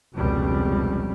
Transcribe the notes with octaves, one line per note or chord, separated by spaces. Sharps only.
F1 C#2 B2 G3